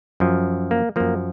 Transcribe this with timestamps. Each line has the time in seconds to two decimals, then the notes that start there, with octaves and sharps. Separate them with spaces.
0.20 F#2 F3
0.71 A#3
0.96 F#2 F3 A#3